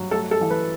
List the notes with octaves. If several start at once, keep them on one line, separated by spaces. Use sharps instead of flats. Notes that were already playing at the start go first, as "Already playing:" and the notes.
Already playing: G2 F#3
A3 A4
A4
E3
B4